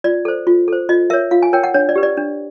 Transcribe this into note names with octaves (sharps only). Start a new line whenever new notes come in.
F4 D5
A4 C5
F4
A4 C5
F4 D#5
A#4 C#5 E5
F4 F5
G#5
A#4 C#5 G5
F#5
D4 C#5
D5
G4 B4
D5
D4